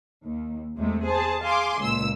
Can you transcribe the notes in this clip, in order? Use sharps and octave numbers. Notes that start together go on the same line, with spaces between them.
D#2
E2 C3 G#3 A3
G#4 C5 A5
G#4 F5 G#5 C6 D6
C#2 A#2 E6